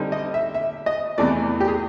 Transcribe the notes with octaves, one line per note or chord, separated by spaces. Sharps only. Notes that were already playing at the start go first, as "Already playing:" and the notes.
Already playing: D3 G3 C4 D#4
D#5
E5
E5
D#5
E2 C3 E3 A3 D5
G4
G#4